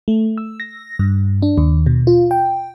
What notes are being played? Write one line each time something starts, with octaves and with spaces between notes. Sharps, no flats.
A3
E6
A#6
G2
D4
D#2
B2
F4
G5